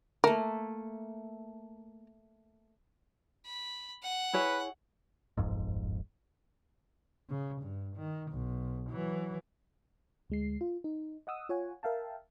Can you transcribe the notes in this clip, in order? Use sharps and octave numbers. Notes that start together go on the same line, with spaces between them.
A3 A#3 A#4
B5
F#5
E4 G#4 B4 C#5
D1 G1 F2 G#2
C#3
G2
D#3
B1
E3 F#3
D2 G#3 C7
F4
D#4
D#5 F#5 D#6 E6
F4 C#5 F#5 G#5
A#4 E5 F5 G5 A5